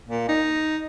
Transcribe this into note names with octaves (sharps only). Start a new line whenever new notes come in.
A#2
D#4